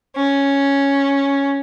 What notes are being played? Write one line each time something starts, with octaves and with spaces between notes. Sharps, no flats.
C#4